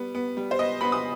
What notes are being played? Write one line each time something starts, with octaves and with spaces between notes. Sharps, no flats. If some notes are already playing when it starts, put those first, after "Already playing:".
Already playing: G3 B3
B3
G3
C5
B3 D#5
B3 B5
D#6